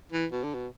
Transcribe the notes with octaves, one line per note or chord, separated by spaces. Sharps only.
E3
B2
D3
B2